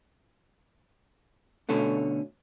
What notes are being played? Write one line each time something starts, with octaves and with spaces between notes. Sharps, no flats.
B2 D3 A3 C#4